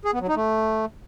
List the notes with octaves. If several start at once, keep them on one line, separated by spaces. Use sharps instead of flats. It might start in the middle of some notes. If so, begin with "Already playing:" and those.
G#4
B3
F#3
D#4
A3